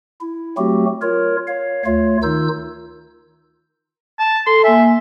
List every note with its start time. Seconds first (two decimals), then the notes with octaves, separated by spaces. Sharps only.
0.21 E4
0.57 F#3 A3 C4 F#4 G4
1.02 F4 A#4 C#5
1.47 C#5 F5
1.85 D2 A3 F4 C#5
2.23 D#3 D#4 F4 E6 G6
4.19 A5
4.47 A4 C6
4.64 A#3 E5 G#5